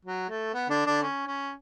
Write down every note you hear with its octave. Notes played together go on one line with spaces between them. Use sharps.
F#3
A3
B3
D3 D4
D3 D4
C#4
C#4